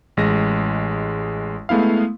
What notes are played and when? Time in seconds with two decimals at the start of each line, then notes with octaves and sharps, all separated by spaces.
0.17 A1 G#3 A#6
1.69 G#3 A3 B3 E4 F5